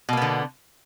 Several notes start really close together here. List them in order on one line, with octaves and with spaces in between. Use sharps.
B2 A#3 B3 D3